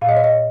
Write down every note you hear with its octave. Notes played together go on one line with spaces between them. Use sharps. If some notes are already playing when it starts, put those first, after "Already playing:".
A#2 F5
D#5
C#5
D#5